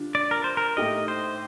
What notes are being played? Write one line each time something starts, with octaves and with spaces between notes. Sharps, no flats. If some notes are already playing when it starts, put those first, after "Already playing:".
Already playing: D3 G3 D4 F4
D5
A#4
C5
A#4
A2 A3 D#4 G4 D#5
C5